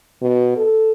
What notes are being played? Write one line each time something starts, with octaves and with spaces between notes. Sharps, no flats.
B2
A4